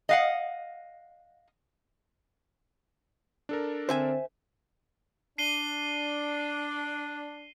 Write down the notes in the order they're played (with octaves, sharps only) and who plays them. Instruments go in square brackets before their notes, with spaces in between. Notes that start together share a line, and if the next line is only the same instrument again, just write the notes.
[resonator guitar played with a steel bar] D#5 F5 F#5
[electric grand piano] D4 A4 A#4
[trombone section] D3 C4 [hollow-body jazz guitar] C5 E5 G#5
[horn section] D4 [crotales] C7 D#7 G7